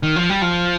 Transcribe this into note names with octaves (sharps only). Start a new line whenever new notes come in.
D#3
F3
G3
F3